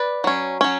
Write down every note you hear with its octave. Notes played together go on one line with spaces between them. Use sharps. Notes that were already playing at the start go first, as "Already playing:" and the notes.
Already playing: B4 D5
F#3 C#4
F#3 C#4